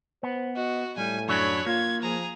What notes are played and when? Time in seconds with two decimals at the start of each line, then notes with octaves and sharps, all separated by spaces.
0.23 B3 C5
0.56 F#4 D#5
0.97 A2 G3 G#5
1.28 F#2 F#3 D4 C#5 B5
1.66 A#3 F4 G#6
2.02 F3 G#4 A#5